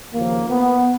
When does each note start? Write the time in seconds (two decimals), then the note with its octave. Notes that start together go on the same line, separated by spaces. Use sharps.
0.14 D#2 C#3 F3 A#3
0.49 B3